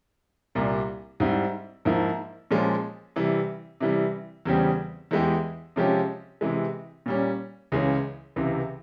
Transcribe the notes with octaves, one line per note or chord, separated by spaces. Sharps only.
C2 A#2 G3 A#3
G#2 G3 C4 E4
G#2 F3 A#3 E4
A#2 F3 G#3 C#4
C3 E3 G3
C3 E3 G3
E2 C#3 G3 C4 G4
E2 E3 G#3 E4 G4
C3 F3 G#3 C#4 G4
C3 E3 G#3
A#2 G3 C#4
C#2 C#3 E3 G#3 C#4
C#2 C3 E3